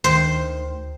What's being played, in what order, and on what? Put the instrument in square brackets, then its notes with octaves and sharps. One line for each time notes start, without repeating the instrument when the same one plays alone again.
[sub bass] D2 [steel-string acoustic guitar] D#3 [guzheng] C5